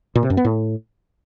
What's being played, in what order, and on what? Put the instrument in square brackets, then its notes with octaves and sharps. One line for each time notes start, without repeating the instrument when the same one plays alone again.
[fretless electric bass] A#2
C3
F#2
B3
A2